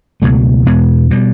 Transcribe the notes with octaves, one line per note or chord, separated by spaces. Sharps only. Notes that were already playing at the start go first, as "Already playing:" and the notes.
C#2 B2 F#3 A3
E2 B2 G#3 B3
B2 G3